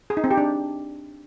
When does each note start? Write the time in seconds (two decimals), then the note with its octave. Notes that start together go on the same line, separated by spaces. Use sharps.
0.10 G#4
0.17 D#4
0.24 C4
0.31 G4
0.37 D4